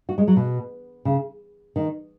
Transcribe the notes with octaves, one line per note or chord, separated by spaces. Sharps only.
F#4
G#3
F#3
B2
C#3
D#3